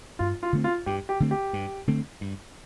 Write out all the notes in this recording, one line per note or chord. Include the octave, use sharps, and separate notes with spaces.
G2 F4
F4
D3 A3 C4
F4
G2 G4
G4
D3 A3 C4
G4
G2
D3 A3 C4
G2